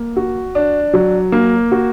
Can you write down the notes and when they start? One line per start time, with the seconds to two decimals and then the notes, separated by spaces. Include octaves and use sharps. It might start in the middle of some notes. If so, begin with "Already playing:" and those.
Already playing: A#3
0.16 F#4
0.55 D4
0.93 F#3
1.32 A#3
1.72 F#4